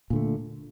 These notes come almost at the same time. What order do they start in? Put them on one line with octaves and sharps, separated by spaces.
A#2 D3 A3